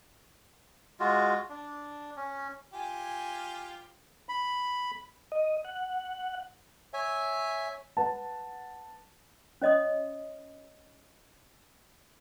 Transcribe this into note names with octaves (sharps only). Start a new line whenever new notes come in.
G#3 F4 F#4
D4
C#4
F4 G4 G#5
B5
D#5
F#5
C#5 E5 G#5
B4 F#5 A5
C#4 C#5 D#5 C6 D#6